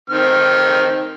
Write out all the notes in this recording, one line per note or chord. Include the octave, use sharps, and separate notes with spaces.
D#3 C4 F6